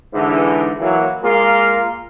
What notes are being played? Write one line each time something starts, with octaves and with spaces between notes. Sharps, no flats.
G#2 D3 E3
E3 F#3 A#3
G#3 A#3 F4 A#4